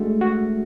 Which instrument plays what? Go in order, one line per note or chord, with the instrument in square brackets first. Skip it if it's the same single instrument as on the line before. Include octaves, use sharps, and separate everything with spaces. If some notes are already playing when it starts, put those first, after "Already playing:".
Already playing: [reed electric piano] G#3 D4 F#4 [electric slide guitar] A3
[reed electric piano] F#4